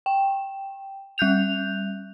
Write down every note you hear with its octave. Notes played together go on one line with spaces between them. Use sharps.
G5
G3 F#6 G6 F7